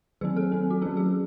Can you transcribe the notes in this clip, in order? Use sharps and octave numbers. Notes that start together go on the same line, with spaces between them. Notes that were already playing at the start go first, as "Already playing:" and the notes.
D#3 F#3 C4 G#4
A4
F#3 C4
F#4
F#3 C#4 G#4
G#4